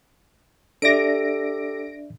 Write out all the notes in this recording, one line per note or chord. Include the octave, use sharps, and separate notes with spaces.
D4 G4 A4 D5 E5 A#6 D7